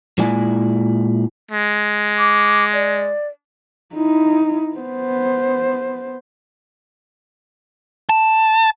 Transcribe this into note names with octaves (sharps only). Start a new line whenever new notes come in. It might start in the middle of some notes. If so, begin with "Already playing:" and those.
A#2 G#3 E4 D5 G#5
G#3
D6
D5
D#4 E4
B3 C5
A5